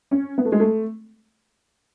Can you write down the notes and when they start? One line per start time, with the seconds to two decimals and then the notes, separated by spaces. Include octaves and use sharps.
0.11 C#4
0.38 B3
0.45 A3
0.52 G#3
0.60 A3